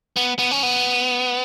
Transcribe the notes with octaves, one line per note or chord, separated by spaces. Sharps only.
B3
B3
C#4
B3